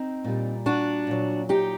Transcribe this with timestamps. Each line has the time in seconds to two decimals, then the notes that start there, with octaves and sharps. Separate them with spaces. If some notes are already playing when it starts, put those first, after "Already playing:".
Already playing: C4 D#4
0.24 A#2 G3
0.66 D4 F#4
1.07 A#2 F#3
1.49 D#4 G4